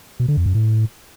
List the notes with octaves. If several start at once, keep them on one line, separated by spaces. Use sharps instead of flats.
B2
D3
F2
F#2
A2